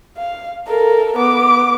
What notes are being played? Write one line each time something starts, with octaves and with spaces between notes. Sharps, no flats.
F5
A4 A#4
B3 D6